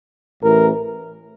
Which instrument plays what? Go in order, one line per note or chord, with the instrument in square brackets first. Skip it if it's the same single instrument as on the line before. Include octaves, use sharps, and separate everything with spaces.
[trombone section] A1 A2 E3 A#4